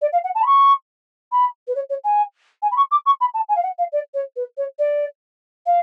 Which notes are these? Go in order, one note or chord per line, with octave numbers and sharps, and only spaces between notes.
D5
F5
F#5
A5
B5
C#6
B5
B4
C#5
C#5
G#5
G#5
B5
C#6
D6
C#6
B5
A5
G#5
F5
F#5
F5
D5
C#5
B4
C#5
D5
F5